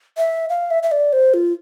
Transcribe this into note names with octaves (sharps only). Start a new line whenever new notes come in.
E5
F5
E5
E5
D5
C5
F4